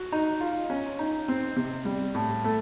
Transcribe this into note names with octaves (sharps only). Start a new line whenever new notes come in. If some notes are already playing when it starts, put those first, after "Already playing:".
Already playing: F#4
D#4
F4
C#4
D#4
C4
C3
G3
A2
A3